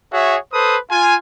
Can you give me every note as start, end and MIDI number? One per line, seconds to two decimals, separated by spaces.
0.11 0.37 66
0.11 0.37 68
0.11 0.37 73
0.11 0.37 76
0.53 0.76 69
0.53 0.76 71
0.53 0.76 72
0.53 0.76 87
0.90 1.15 65
0.90 1.15 80